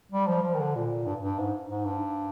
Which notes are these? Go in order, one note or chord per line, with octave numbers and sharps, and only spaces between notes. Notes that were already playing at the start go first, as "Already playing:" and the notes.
G3
F3
F3
D#3
D3
A#2
G2
G2
G#2
G#2
G2